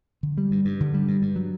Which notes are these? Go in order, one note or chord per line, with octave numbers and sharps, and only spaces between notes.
D3
G3
G2
G2
D3
G3
G2
G2
F#3